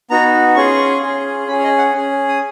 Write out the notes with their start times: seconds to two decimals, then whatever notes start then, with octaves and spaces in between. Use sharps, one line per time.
0.10 B3 D#4 F#4 A#5
0.56 C#4 F4 G#4 C#6
1.02 C#4 F4 G#4
1.48 C#4 B5
1.52 G#4
1.59 C#5
1.64 D#5
1.78 F#5
1.94 C#4 G#4
2.28 D#6